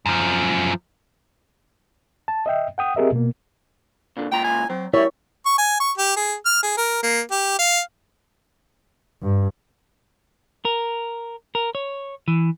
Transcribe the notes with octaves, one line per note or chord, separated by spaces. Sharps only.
F#2 F3
A5
D#5 E5 G5
F#5 G5 D#6
C4 G4 G#4 A#4 D#5 E5
B2 A#3
A#2 D3
C#2 A#2 G5 A#5
G#5
F#3 C4
G3 E4 A#4 C#5 E5
C#6
G#5
C#6
G4
G#4
F6
G#4
A#4
A#3
G4
F5
G2
A#4
A#4
C#5
E3